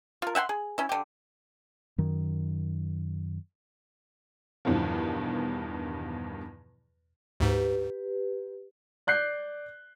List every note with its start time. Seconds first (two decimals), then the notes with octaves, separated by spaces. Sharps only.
0.22 F4 A#4
0.35 E5 F#5 G5 C6
0.49 G#4
0.78 C#4 E4
0.89 D3 G4
1.98 F#2 D#3
4.65 E2 G2 B2 D#3 F3
7.40 D2 G#2 G4 B4
9.07 D5 F#6 G6 C7